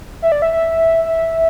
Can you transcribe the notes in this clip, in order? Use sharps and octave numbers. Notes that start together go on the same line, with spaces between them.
E5
D5
E5
E5
E5